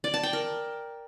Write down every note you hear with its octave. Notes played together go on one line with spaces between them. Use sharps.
D5
A5
G5
A#4